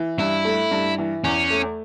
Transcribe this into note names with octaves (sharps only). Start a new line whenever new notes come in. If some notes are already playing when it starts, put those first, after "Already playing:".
Already playing: E3
G2 E4
A3
G2
E3
E2 C#4
A3